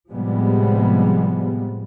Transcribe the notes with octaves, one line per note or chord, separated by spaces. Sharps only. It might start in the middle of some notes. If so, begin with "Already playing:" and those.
A2 C3 F3 G3 G#3 B3